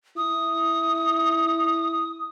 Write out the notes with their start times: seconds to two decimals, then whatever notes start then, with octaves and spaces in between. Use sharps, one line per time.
0.17 E4 D#6